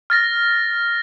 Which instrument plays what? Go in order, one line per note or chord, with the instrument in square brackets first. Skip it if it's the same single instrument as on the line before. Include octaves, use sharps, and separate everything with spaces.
[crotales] F6 A6 A#6